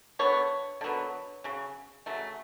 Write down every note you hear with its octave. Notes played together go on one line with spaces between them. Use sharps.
D3 F#3 B3 C#5
D3 F#3 B3
C#3 F#3
C#3 F#3 A3